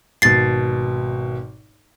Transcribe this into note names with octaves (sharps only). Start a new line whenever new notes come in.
G#1 B2 A6 C7